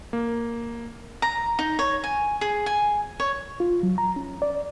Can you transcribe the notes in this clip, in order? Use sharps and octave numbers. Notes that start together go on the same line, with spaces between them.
A#3
A#5
D#4
C#5
G#5
G#4
G#5
C#5
F4
F#3
A#5
C#4
D5